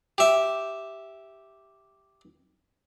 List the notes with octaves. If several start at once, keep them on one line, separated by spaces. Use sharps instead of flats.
G4 E5